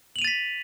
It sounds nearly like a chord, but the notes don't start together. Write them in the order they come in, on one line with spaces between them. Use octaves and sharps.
F#7 F7 D#7 A6 B6